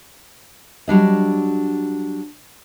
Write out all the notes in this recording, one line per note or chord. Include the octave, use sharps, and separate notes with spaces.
F#3 G3 D4 D#5